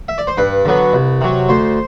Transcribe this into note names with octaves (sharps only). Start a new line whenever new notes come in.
E5
D5
C5
G2 B4
D3 F#3 B3
C2
C3 F#3
D2 C5